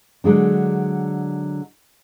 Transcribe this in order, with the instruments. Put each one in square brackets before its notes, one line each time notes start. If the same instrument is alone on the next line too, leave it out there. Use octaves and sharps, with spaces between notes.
[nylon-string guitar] D3 F#3 G#3 D4